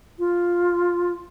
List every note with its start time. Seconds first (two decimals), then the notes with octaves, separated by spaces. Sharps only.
0.19 F4